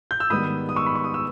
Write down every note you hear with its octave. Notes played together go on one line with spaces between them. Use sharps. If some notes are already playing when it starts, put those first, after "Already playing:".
G6
E6
G#2 D#3 G3 B3 B5 D#6
D#6
C#6 E6
B5
C#6
D#6
E6